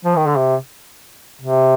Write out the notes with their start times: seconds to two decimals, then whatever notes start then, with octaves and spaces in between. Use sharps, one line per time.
0.05 F3
0.16 D#3
0.27 D3
0.37 C3
1.41 C3